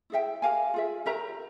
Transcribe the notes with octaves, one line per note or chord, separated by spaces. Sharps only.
E4 G#4 E5 G5
G4 A#4 F5 G#5
F4 G#4 E5
G4 A#4 E5 A#5